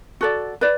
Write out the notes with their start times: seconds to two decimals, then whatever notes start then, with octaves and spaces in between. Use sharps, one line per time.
0.21 F#4 A4 D5
0.61 B4 D5